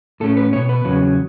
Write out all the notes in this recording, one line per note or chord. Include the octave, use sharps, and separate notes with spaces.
A2 A3 C#4 A4
B4
B2 B3 C#5
B4
E2 C#3 F#3 C#4